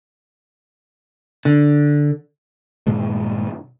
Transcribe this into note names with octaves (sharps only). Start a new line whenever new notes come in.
D3
G2 A#2 D#3 G#3